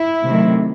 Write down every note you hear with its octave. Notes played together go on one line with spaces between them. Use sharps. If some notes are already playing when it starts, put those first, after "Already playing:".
Already playing: E4
C3 D#3 F#3 A3